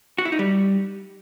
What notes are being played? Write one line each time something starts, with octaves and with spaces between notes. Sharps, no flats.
F#4
E4
D#4
G3